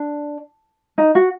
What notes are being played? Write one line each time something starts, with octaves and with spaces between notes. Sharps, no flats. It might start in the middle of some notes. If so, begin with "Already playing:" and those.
Already playing: D4
D#4
F#4